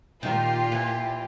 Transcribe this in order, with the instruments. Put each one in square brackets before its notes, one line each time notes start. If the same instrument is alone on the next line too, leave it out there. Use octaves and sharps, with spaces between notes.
[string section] A#2 F4 [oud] D#3 [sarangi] G4
[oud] E3